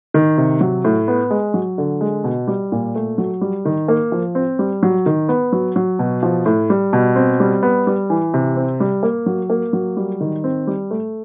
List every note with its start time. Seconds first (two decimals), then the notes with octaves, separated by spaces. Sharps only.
0.14 D#3
0.38 C3
0.61 F#3
0.84 A2
1.08 B3
1.31 G#3
1.54 F#3
1.78 D3
2.01 G#3
2.24 B2
2.48 G3
2.72 A#2
2.95 A3
3.18 F#3
3.41 G3
3.65 D#3
3.88 A#3
4.12 F3
4.35 C4
4.59 G3
4.83 F#3
5.06 D#3
5.29 B3
5.53 F#3
5.76 F#3
5.99 B2
6.23 F3
6.46 A2
6.70 G3
6.93 B2
7.16 C4
7.40 G3
7.63 B3
7.87 G3
8.10 E3
8.34 C3
8.56 C4
8.80 G3
9.03 A#3
9.26 F#3
9.50 A#3
9.73 F#3
9.97 G3
10.21 D#3
10.44 C4
10.67 G3
10.91 A3